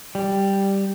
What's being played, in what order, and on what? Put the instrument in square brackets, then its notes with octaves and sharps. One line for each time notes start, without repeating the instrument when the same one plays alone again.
[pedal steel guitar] G3